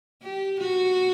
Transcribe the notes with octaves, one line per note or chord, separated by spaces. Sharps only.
G4
F#4